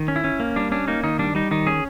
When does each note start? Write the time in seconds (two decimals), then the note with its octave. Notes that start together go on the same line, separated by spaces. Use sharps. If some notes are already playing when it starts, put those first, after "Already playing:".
Already playing: D#3
0.08 C#4
0.16 E4
0.24 C#4
0.40 A#3
0.56 G3 D4
0.72 C#4 D4
0.88 A#3 D#4
1.04 D#3 D#4
1.19 G3 D4
1.35 G3 D#4
1.51 D#3 D#4
1.67 C#4 G#4